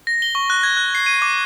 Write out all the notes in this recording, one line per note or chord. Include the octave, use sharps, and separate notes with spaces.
A#6
G7
C#6
F#6
G#6
F#6
C7
D#7
D6